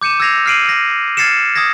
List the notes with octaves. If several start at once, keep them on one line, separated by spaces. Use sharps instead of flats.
D6 G6 C#7 D#7 E7
E6 G6 G#6 A#6 C7 F7
F6 A#6 C7 D7 D#7 F#7
E6 A#6
F6 G#6 A6 C7 C#7 E7
D#6 E6 G#6 A#6